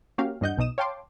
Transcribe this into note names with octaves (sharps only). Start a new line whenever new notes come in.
A#3 C#4 F#4 G4 A#4 F5
E2 G2 D4 D#5 F#5 G6
B1 B2 D#4 D#6 E7
C#5 F5 G5 A5 C6 D6